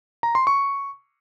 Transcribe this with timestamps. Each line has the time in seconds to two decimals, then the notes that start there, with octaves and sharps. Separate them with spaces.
0.23 A#5
0.35 C6
0.47 C#6